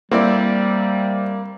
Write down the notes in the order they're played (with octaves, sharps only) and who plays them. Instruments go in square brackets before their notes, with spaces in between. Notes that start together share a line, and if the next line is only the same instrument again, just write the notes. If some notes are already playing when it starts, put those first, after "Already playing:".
[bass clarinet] G3 [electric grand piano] A#3 [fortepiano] C4 E4 D5